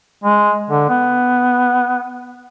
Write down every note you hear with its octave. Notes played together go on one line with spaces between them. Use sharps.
G#3
D3
B3